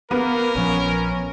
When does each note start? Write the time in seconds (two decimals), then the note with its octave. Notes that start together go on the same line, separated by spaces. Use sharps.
0.11 A#3 B3 A#4
0.55 A#1 F3 C#4